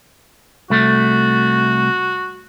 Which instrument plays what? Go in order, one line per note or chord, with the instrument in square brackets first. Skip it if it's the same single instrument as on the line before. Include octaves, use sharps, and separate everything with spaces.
[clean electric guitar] C2 A3 [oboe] F#4